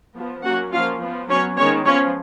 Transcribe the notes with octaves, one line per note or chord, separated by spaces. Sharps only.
F3 B3
F#3 A#3 C#4 F#4 F#5
F3 A#3 C#4 F4 F5
F3 B3
F#3 B3 C#4 C#5
D#3 G#3 B3 C#4 C#5
F3 B3 C#4 C#5